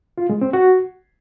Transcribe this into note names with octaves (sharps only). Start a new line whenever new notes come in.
F4
G#3
C4
F#4